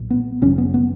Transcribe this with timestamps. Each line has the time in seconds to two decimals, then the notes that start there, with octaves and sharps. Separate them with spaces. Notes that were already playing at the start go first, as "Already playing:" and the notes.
Already playing: B1 A#2
0.10 B3
0.42 G#1 F#2 C#3 C#4
0.58 B3
0.74 B3